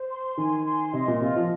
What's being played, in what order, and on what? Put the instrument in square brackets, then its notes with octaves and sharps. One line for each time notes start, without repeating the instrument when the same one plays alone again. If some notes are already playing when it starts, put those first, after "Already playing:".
Already playing: [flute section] C5
C6
[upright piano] D#3 [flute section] G#5
[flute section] C6
[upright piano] C3 [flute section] D#5
[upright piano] A#2
[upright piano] C3 [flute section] F4
[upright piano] F3